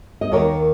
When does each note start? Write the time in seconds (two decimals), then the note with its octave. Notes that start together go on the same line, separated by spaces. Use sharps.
0.21 D#5
0.32 D#2 D#3 A#4 C#5